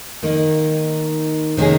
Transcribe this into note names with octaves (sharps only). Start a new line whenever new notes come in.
D#3 A#3 D#4
C3 D#3 A#3 C#4 G#4